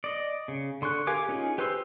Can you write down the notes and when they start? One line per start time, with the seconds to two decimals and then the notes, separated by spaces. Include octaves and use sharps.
0.04 D5 D#5
0.48 C#3
0.82 D3 C6 C#6 F#6
1.07 G4 A#4 F5 G#5 D6
1.29 C#4 D#4 F4 G#4
1.58 G4 B4 C5 C6 E6